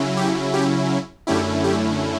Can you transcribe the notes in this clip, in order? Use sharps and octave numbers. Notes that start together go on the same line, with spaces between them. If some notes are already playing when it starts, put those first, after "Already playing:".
Already playing: C#3 F#3 C#4 E4
G4
G4
F#2 D3 A3 C#4 E4 G4
G4